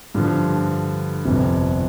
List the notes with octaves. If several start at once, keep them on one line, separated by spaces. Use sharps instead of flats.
G2 D3 F3
G1 F2 C3